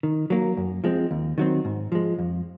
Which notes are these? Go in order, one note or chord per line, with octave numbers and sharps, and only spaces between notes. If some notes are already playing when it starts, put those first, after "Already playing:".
D#3
F#3 A#3
F#2
F3 G#3 C4
D#2
D#3 F#3 C4
G#2
F3 G#3
F2